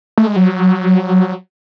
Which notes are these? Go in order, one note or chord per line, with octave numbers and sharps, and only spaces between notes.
A3
G#3
F#3